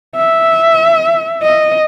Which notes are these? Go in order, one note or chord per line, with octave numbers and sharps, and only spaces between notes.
E5
D#5